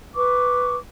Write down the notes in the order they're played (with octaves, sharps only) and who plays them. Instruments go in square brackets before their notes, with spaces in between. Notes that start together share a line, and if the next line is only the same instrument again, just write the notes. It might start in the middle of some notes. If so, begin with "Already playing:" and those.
[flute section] B4 C#6 D6